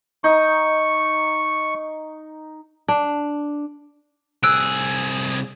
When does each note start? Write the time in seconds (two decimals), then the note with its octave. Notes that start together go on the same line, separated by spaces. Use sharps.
0.24 D#4 C#6
2.88 D4
4.43 C2 G#4 E6 F#6 D7